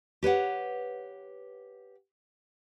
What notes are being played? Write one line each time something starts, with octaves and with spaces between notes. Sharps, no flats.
G4 B4 C#5 F#5